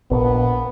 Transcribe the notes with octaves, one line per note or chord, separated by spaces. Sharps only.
A#1 A#2 B3